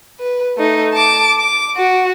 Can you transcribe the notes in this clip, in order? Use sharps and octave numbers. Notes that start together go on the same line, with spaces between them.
B4
A3 D#4
A5 D6
D6
F#4